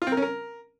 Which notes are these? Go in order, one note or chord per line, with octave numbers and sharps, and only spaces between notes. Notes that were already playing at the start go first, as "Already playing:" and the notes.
F4
C4
A#4
C#4
A#4